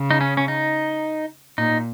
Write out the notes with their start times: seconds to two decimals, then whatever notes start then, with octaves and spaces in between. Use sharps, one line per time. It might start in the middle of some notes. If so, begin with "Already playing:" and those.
Already playing: C#3
0.11 D#4
0.21 C#4
0.37 C#4
0.48 D#4
1.58 A#2 D#4